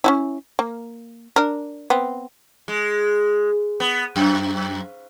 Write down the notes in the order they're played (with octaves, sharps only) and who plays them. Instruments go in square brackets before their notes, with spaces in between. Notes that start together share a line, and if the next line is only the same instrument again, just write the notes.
[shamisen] C#4 D#4 E4
A#3
D4 A#4
B3 C4
[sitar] G#3
B3
F#2